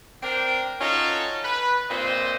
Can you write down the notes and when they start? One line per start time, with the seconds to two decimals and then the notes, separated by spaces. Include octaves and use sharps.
0.22 C4 D4 A#4 G5
0.81 C#4 D#4 F4 F#4 A4
1.43 B4
1.89 G2 A#2 C4 C5 D#5